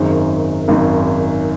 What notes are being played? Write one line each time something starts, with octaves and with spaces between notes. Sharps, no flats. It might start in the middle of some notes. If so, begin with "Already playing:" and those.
Already playing: G#1 F#2 D#3 G#4 C5
G#1 F#2 D#3